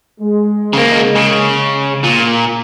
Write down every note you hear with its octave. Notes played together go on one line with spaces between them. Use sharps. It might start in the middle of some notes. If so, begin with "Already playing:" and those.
G#3
C#3 A#3
C#3
A#2